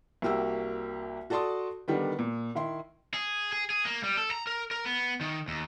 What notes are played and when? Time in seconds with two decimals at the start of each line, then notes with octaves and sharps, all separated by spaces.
0.22 C2 A#3 F#4 G4 E6
1.30 F#4 A4 D5 A5 C6 D#6
1.88 D3 D#3 G3 B3
2.19 A#2
2.55 D#3 E4 C6
3.14 G#4
3.53 G#4
3.70 G#4
3.85 A#3
4.03 G3
4.17 A4
4.31 A#5
4.47 A#4
4.71 A#4
4.86 B3
5.21 D#3
5.48 D#2